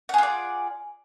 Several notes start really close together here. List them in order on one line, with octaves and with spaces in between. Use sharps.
F#5 G#4 F4 D5